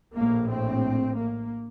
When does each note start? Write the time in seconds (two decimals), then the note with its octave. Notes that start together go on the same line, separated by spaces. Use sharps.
0.15 A#1 A2 A#3
0.49 C4
1.16 A#3